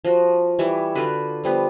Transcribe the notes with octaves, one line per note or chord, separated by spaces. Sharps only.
F3 F#4
E3 G3 C#5 E5
D3 F4 F#4 B4
F3 G3 B3